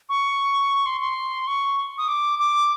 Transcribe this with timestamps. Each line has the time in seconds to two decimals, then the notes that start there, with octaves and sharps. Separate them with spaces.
0.09 C#6
0.86 C6
1.01 C6
1.47 C#6
1.98 D#6
2.08 D6
2.39 D6